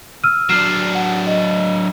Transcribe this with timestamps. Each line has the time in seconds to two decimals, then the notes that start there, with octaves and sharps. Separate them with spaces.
0.24 E6 F6 D#7
0.49 F#3 D4 F6 C7 E7
0.95 F#5
1.27 D#5